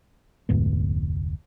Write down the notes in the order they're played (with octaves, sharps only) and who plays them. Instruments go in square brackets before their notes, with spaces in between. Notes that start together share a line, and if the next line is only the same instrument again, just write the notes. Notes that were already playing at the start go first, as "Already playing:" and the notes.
[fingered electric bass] F1 D2 G#2 B3